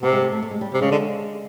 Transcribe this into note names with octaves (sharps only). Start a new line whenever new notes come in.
C3 B3
G#3
A3
A3
A3
G#3
G3
C3 G3
C#3 G#3
D3